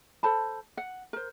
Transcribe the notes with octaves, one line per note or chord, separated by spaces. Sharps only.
A4 C5 A5 B5
F#5
A#4 C5